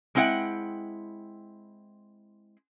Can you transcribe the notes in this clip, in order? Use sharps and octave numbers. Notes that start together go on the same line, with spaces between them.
G#3 C4 E4 C#5 F#5 G5